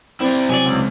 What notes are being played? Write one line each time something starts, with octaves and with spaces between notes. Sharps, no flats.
C4 E4 D5
C2 F#3 D5 G#5
C#2